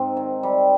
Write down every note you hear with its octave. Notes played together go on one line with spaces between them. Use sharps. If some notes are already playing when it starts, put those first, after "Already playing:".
Already playing: G#2 C4
D#3
G3